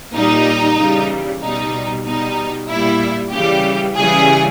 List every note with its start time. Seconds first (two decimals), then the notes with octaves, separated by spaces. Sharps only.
0.14 A#2 G3 D#4
0.77 C#3 E3 G3
1.41 B2 G3 D#4
2.05 B2 G3 D#4
2.69 A#2 G3 E4
3.32 C#3 E3 G3 G4
3.96 C#3 E3 G3 G#4